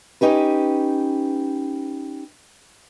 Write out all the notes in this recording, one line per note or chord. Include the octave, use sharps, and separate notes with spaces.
C#4 D#4 G4 B4